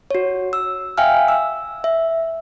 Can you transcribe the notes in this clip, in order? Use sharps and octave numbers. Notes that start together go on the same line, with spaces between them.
F#4 C#5
E6
E5 F5 G5 G#5 F6
E6
E5